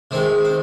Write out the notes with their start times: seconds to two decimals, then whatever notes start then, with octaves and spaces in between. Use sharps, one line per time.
0.11 C3 D#3 G#3 C4
0.45 C4